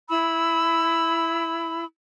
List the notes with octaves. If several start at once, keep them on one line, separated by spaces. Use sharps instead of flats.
E4 B5 E6